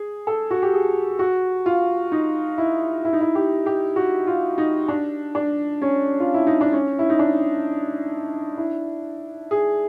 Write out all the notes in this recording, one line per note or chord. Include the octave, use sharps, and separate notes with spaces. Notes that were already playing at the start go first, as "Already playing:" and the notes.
Already playing: G#4
A4
F#4
G4
G#4
F#4
F4
D#4
E4
E4
D#4
E4
G4
G4
F#4
F4
D#4
D4
D4
C#4
F4
E4
D#4
D4
C#4
E4
D#4
D4
E4
G#4